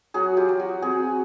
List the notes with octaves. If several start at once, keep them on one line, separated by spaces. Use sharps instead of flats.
F#3 F#4 G#4
F4 G4
F#3
F#4
C4 F#4 G#4